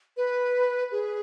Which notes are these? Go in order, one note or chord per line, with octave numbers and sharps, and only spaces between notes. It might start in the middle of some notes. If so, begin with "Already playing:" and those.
B4
G#4